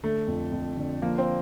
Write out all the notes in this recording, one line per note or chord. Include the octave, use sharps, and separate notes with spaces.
D3 A3
F2
F2
D3
F3 A#3
C4